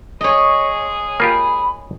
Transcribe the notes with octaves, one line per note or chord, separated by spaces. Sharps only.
G#3 G#4 C#5 D#5
A#3 F4 G4 B5